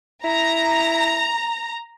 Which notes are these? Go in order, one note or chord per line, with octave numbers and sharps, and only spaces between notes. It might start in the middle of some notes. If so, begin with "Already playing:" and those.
E4 A#5